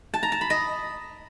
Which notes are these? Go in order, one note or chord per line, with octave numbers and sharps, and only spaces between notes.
A5
A#5
A5
B5
D#5